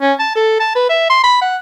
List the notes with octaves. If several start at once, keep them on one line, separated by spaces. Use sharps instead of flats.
C#4
A5
A4
A5
B4
E5
C6
B5
F#5